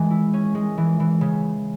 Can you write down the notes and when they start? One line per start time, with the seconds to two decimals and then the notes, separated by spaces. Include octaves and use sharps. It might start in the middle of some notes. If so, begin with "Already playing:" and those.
Already playing: E3 G#3
0.10 E4
0.33 C#4
0.55 G#3
0.78 E3
1.00 E3
1.21 C#3